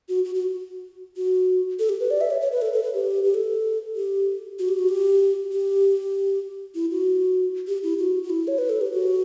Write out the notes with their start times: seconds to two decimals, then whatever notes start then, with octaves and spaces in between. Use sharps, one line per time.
0.09 F#4
0.24 F#4
0.35 F#4
1.17 F#4
1.79 A4
1.89 G4
2.00 B4
2.11 D5
2.21 E5
2.30 C#5
2.41 C#5
2.52 B4
2.61 A4
2.73 A4
2.83 B4
2.94 G4
3.24 G4
3.34 A4
3.96 G4
4.59 F#4
4.68 G4
4.79 F#4
4.89 G4
5.52 G4
6.75 E4
6.91 F#4
7.67 G4
7.83 E4
7.98 F#4
8.23 F#4
8.30 E4
8.47 C#5
8.58 B4
8.69 A4
8.81 G4
8.92 F#4